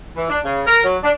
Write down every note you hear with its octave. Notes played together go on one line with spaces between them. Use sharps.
E3
D4
C#3
A#4
F#3
D4